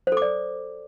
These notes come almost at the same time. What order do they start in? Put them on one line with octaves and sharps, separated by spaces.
C5 A4 D6 D5